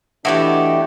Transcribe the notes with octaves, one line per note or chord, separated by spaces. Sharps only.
E3 A3 B3 D4 E4 F#4 G4 D#5